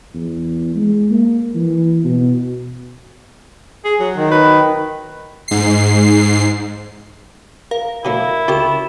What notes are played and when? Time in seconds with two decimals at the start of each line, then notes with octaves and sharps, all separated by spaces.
0.14 E2
0.75 G#3
1.11 A#3
1.55 E3
2.04 B2
3.85 G#4
4.00 F#3
4.16 D#3
4.31 B4
5.48 G#2 C7
7.71 A#4 F5
8.05 B2 F#3 A3 E4
8.48 C#2 C#4 F#4 G4 A#4 E7